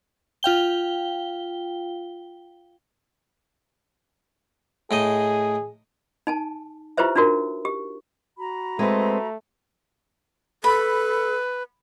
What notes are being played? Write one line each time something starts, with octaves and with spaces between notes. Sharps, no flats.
F4 F5 G5 G7
A2 D#4 G#4 D#5
D#4 G#5 A5
E4 F4 G4 B4 C5 E5
D4 D#4 F4 F#4 A#4
G4
F#4 A#5 B5
G#3 A3 C4 B4
A4 B4 B5